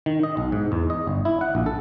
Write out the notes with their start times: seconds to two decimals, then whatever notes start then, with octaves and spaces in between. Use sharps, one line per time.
0.06 D#3
0.23 D#5
0.37 B1
0.52 G#2
0.72 E2
0.90 D#5
1.07 G1
1.25 E4
1.41 F#5
1.55 A#1
1.66 A4